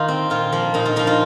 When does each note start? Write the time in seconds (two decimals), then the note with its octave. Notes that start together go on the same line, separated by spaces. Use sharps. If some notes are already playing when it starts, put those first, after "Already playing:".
Already playing: D#3 A#3 D#4 F4
0.08 C4
0.30 A#2 F4
0.52 F3 A#3
0.74 A#2 D#4
0.85 F4
0.96 F3 A#3 D#4
1.07 F4